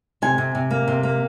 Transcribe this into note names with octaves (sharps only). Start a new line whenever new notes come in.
C3 G#5
C3
C3
A#3
C3
A#3